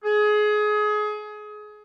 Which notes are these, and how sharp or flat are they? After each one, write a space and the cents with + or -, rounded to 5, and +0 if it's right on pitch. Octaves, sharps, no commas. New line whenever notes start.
G#4 +25